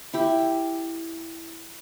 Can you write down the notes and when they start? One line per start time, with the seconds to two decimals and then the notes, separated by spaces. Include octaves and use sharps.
0.13 E4 G4